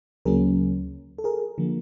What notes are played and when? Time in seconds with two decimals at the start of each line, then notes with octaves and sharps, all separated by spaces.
0.25 D2 C#3 F#3 A#3 C#4 G#4 A#4
1.18 A4
1.24 G#4 A#4
1.58 D3 F3 A#3